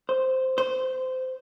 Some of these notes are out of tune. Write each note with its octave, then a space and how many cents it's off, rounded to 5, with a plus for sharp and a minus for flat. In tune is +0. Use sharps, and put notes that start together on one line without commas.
C5 -5
C5 -20